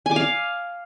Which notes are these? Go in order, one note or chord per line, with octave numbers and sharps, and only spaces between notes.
G#5
D6
F5